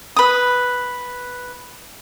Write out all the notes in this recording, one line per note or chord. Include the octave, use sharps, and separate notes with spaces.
B4 D#6